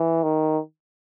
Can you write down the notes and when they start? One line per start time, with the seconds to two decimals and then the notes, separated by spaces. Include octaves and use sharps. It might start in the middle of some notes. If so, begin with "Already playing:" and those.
Already playing: E3
0.23 D#3